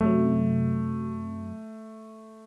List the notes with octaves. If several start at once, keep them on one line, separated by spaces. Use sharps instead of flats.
F#2 C3 F#3 A3